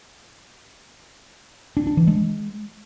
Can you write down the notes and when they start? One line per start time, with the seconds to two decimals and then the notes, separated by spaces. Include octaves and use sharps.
1.77 D4
1.87 D4
1.97 E3
2.07 G#3